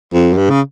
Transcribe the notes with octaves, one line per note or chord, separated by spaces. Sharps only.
F2
F#2
G2
C#3